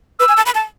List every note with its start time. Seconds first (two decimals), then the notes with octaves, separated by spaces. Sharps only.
0.19 B4 E6
0.28 G#5
0.37 A5
0.46 B5
0.55 A5